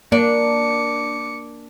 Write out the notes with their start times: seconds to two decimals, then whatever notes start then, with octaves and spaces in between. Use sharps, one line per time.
0.12 A#3 D4 D6 C#7